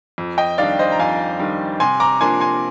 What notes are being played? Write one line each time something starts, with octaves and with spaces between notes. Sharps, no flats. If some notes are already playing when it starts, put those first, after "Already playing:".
F2
D#5 G5
D#3 G3 D4 D5 F5
C5 D#5
A#5
F2 F5 G#5
D#3 G3 D4
C3 G#5 C6
A#5 D6
F3 A#3 D4 G#5 C6
G#5 C6